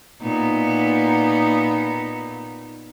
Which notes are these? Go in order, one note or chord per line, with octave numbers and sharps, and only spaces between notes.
A#2 B3 D#4